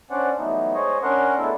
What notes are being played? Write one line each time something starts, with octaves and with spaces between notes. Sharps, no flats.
C#4 D4 C5 D5 F#5
E3 F#3 G3 A3 B3 D#4
G#3 C5 C#5 D#5
C#4 D4 A#4 F#5 C6
G#3 A3 B3 D4 E4 A4